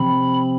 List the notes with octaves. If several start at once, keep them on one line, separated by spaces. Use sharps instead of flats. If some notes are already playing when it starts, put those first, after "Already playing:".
Already playing: C3 F3 C4 B5